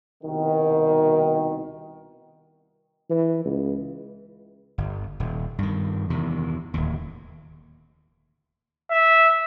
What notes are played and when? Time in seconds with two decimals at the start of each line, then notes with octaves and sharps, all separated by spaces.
0.24 C2 B2 D#3
3.10 E3
3.45 C#2
4.78 G1
5.20 D#1
5.58 G2 D#3
6.10 E2 C3 D#3
6.74 D1 D#2
8.91 E5